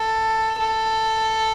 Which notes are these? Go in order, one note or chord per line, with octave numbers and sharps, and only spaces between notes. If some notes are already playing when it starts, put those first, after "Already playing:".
Already playing: A4
A4